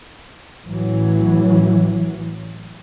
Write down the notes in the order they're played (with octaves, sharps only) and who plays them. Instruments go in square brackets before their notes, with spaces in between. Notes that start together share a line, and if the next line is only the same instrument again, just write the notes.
[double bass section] A1 E3 F#3